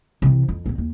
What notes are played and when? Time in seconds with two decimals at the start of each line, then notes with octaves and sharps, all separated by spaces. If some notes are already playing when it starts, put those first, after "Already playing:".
0.22 C3 E3
0.48 F2
0.66 A#1 C4
0.78 D#2